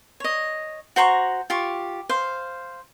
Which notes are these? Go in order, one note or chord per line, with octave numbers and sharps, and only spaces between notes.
C#5 D#5
F#4 C5 A#5 C#6
F4 G4 C#6
C5 F5